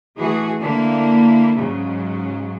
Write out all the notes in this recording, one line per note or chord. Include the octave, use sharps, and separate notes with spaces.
E3 A3 F#4 G#4
D3 A#3 E4
G#2 C#3 F#3